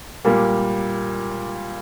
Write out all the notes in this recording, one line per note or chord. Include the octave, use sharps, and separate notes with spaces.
A#2 G3 A#3